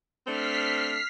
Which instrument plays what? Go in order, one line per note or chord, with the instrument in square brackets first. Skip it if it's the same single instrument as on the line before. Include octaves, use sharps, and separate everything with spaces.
[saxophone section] A3 C4 D4 [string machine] F6 B6 C7